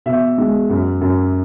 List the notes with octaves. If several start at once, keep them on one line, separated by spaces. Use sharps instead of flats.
B2 E5
G#3
F#2
F#2